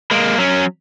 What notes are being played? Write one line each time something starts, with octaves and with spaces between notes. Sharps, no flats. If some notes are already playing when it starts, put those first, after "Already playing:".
G#3 A#3
F#3 C#4